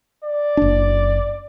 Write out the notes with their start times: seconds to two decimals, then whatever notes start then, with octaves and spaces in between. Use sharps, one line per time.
0.24 D5
0.57 F#1 D4